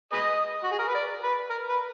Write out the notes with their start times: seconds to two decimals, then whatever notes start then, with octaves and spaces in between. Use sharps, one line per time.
0.13 G#4 B4 D#5
0.63 F#4
0.71 G#4
0.79 A#4
0.88 B4
0.95 D5
1.23 B4
1.50 A#4
1.69 B4